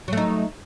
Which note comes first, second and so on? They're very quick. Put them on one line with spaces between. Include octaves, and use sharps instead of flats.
F#3 A3 D#4